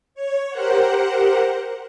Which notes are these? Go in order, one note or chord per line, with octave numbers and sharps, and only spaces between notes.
C#5
G4 A#4 C5 F#5